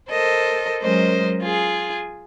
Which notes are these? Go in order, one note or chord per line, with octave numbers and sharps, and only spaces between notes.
A4 A#4 C5 D#5
F#3 G#3 C#4 A#4 C5 D#5
F4 G#4